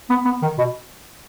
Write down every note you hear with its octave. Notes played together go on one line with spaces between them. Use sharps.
B3
B3
D#3
B2